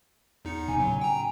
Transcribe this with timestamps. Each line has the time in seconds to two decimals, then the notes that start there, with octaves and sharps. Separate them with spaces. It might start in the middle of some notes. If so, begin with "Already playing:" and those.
0.45 E2 D#4 C#7
0.68 C3 C4 G#5
0.80 A2 C#3 F#3
1.01 G5 A#5